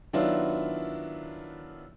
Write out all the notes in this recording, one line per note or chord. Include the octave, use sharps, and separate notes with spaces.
D#3 F#3 B3 D4 E4 F4